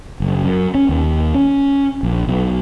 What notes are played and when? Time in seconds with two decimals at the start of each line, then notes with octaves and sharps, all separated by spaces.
0.20 F#1
0.45 F#2
0.75 C#4
0.89 D#2
1.34 C#4
2.03 A#1
2.28 B1